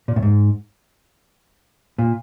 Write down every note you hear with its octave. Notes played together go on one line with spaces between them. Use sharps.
A#2
A2
G#2
A#2